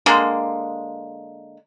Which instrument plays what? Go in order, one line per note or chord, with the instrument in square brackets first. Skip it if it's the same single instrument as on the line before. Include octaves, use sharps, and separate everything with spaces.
[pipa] D3 G#3 A#3